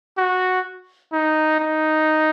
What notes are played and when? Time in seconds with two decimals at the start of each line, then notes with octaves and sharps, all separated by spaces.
0.18 F#4
1.13 D#4
1.60 D#4